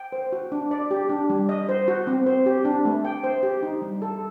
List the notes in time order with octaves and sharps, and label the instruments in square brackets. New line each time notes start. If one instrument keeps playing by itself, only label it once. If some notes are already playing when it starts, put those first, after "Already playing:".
Already playing: [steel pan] G5
C5
F#4
D4
D5
G4
D4
G3
D#5
C5
F#4
C4
C5
G4
D4
A3
G5
C5
G4
D#4
G3
A4